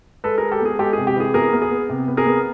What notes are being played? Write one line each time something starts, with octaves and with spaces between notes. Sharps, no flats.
G#3 A4 B4
G#3 G#4 A#4
G4 A4
B3 G#4
G#3 G4 A4
C3 G#4
G4
E3 G#4
B3 G#4 A#4
B3
G#4
B3
C3
B3
G#4 A#4
B3